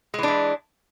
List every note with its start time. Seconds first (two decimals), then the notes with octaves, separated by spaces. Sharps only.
0.14 G#3
0.18 E3
0.23 D4
0.28 E4